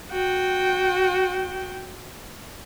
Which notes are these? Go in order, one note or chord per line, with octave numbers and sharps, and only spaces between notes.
F#4 G5